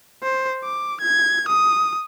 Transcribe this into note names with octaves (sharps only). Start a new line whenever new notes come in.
C5
D6
G#6
D#6